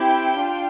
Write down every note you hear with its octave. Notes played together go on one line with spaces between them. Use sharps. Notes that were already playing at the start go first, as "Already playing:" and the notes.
Already playing: C4 E4 G4 G5
D4 F4